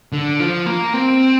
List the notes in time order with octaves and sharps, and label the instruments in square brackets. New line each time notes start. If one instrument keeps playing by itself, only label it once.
[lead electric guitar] D3
F3
A#3
C4